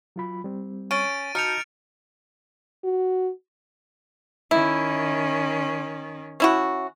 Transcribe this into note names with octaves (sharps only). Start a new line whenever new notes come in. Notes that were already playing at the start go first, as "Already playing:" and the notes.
F#3 F4 B5
G3 C4
C#4 A6 D7 D#7
D#4 F#4 A5 F6 G6 C#7 F7
F#4
D#3 C#4 E4
C#4 E4 F#4